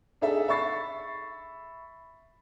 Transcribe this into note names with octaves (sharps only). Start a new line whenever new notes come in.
D4 D#4 G#4 A4 E5
E5 B5 C#6 A6 C7